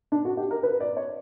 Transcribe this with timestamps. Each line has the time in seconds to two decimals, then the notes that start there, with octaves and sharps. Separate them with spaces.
0.12 D4
0.25 F#4
0.37 G4
0.51 A#4
0.63 B4
0.80 D5
0.97 C#5